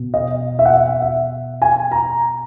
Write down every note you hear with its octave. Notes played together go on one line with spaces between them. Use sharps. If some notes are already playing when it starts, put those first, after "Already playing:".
Already playing: B2
D#5
E5
F#5
E5
E5
G#5
A#5